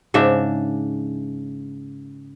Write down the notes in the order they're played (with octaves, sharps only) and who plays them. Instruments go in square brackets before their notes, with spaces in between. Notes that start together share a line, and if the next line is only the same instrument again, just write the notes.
[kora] G#2 C#3 D4 E5